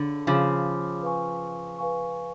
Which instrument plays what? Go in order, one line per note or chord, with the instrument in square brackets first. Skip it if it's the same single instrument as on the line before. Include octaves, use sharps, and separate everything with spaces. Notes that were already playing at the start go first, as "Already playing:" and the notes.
Already playing: [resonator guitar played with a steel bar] D3 [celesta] G#4 C#5 F5 B5 D6
[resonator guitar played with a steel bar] C#3 F3 [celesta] G#4 C#5 F5 B5 D6
[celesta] B4 F5 G#5 C#6
B4 F5 G#5 C#6